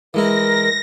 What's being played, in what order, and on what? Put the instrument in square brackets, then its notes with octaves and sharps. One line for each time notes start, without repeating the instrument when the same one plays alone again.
[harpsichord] E3 G#3 E4 [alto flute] A#4 [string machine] A#6